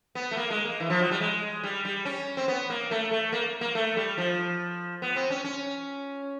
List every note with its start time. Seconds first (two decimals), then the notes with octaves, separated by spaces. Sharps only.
0.15 B3
0.31 A3
0.37 A#3
0.50 G#3
0.65 A#3
0.80 E3
0.90 F3
1.00 F#3
1.11 G3
1.21 G#3
1.63 G3
1.85 G3
2.05 C#4
2.37 C4
2.48 B3
2.70 A#3
2.91 A3
3.11 A3
3.32 A#3
3.61 A#3
3.75 A3
3.96 G3
4.18 F3
5.02 B3
5.16 C4
5.30 C#4
5.44 C#4